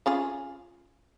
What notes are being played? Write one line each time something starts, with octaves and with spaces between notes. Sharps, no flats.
C#4 F4 G#4